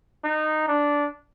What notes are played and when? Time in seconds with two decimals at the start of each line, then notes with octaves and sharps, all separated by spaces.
0.24 D#4
0.67 D4